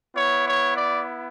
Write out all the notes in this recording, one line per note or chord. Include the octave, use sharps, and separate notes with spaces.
B3 E4 C#5
C#5
D5